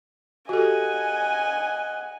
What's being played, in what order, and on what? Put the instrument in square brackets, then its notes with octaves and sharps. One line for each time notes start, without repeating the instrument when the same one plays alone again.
[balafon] F#4 G4 A4 [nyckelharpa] D#5 F#5 [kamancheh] G#5